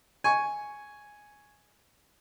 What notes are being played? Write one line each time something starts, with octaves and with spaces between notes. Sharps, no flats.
G#5 C#6